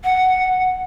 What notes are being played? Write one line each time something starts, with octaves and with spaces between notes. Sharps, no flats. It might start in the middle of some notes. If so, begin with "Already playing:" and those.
F#5